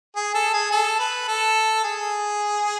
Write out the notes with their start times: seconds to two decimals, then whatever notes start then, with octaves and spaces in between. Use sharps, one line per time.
0.16 G#4
0.34 A4
0.54 G#4
0.71 A4
0.99 B4
1.28 A4
1.84 G#4